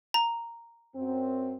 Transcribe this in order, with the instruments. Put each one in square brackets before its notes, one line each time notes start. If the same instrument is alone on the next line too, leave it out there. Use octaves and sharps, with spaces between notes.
[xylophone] A#5
[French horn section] F#2 C4